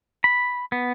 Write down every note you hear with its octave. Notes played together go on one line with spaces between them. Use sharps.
B5
B3